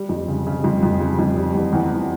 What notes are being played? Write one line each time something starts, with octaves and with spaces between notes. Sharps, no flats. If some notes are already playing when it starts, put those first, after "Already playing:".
Already playing: G3
F2
C#3
C#3
F2
F2
C#3
F2
G3
E2
E2
E2